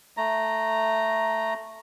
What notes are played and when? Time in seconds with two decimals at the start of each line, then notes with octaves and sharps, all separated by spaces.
0.17 A3 A#5